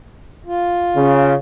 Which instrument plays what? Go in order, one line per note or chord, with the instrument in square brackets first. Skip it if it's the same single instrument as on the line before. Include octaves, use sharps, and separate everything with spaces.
[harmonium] F4
[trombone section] C#3